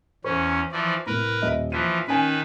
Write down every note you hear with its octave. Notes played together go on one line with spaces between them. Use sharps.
E2 C#4 C5 C#6
E3 F3 D5
C2 A2 A#4 B4
D#1 D#5 E5
E3 F3 F#6 B6 D#7
D#3 C#4 B4 G#5